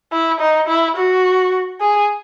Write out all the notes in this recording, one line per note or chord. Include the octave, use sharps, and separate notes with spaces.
E4
D#4
E4
F#4
G#4